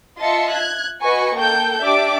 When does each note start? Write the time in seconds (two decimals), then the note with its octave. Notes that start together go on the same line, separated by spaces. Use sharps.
0.18 F4 D#5 E5 A5 C6 C#7
0.53 F#6 G#6
1.01 F#4 B4 D#5 G#5 C#6
1.35 A#3 A4 G5 G6
1.81 D4 G4 D5 E5 D6